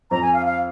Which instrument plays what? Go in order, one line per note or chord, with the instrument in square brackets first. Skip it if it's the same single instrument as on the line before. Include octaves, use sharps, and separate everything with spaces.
[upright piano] F2 [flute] A#5
[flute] G#5
F5
F5